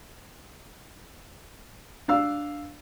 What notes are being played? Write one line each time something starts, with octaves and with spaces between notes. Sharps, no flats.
D4 F5 E6